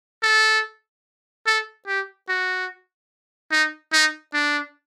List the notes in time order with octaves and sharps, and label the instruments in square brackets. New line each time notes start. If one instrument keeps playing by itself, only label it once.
[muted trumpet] A4
A4
G4
F#4
D#4
D#4
D4